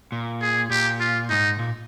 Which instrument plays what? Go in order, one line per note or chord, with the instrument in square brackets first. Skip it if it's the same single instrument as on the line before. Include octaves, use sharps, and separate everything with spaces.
[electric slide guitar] A#2
[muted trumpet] G#4
[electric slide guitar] A#2 [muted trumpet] G4
[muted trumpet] F4
[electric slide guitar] G#2 [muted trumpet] D#4
[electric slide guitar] A#2